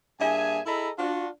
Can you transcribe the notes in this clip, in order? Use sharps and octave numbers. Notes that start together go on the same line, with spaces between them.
G2 A#3 G#4 E5 G#5
E4 G#4 A4 D#5 A#5 B5
D4 F4 F#4